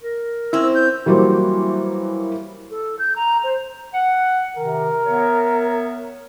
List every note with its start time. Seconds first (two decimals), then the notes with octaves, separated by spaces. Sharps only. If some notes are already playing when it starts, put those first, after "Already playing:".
0.03 A#4
0.53 C4 C#4 E4 E6
0.75 G6
1.06 E3 F#3 G3 A#3 C5
2.70 A4
2.99 G6
3.16 A#5
3.44 C5
3.93 F#5
4.57 C3 D#3 A#4
5.05 B3 C#5 E5